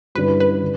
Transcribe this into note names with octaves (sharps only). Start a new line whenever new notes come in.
G2 D3 G3 C#4 E4 B4
B4
D3 D4